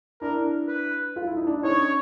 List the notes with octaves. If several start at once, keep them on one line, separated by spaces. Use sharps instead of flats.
D4 E4 A#4
B4
F4
E4
D#4
D4 E4
C#4 D#4 C#5